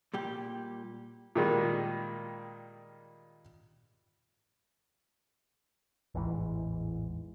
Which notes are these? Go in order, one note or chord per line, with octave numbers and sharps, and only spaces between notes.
A#2 G3 G4
A#2 D#3 G3 G#3
A1 E2 G#2 E3